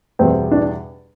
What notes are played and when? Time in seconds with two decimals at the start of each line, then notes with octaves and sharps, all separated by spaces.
0.19 E2 B2 G3 C4
0.51 D4